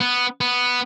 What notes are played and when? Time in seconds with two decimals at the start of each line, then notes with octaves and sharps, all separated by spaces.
0.01 B3
0.41 B3